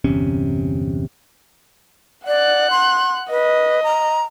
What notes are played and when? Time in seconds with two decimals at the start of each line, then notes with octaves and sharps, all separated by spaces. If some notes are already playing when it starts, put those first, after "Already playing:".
0.04 G1 E2 C3 C#4
2.27 D5 F#5 F#6
2.71 C6
3.30 B4 D#5
3.83 A#5